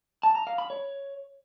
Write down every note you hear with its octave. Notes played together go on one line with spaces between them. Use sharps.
A5
A#5
F5
B5
C#5